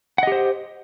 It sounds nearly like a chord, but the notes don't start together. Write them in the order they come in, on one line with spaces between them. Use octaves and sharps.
F#5 D#5 G4 C5